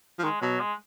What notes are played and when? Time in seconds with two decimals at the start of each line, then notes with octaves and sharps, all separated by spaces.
0.19 F3
0.24 D#3 G#3
0.41 B2 F#3
0.60 G#3